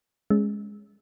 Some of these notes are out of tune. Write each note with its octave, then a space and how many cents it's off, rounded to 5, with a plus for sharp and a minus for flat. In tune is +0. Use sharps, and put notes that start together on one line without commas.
G#3 +0 C#4 +0